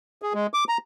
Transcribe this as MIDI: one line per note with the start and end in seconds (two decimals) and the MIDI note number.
0.22 0.33 68
0.34 0.47 56
0.54 0.64 86
0.69 0.78 82